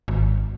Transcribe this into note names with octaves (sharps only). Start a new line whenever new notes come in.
G#1